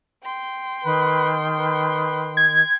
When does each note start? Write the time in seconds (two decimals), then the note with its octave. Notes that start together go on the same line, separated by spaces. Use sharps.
0.23 G5 C6
0.85 D#3 B4
1.59 B4
2.37 G#6